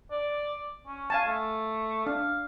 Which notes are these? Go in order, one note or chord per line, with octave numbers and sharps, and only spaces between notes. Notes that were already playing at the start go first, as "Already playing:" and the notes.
D5
C#4
F5 G#5 A5
A3
D4 F5